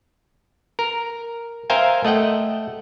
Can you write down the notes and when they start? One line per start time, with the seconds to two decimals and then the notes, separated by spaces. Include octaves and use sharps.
0.79 A#4
1.70 A#4 C5 E5 F5 G5 G#5
2.05 A3 D#5 F#5 G5